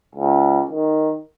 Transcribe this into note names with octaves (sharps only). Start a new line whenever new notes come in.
C#2
D#3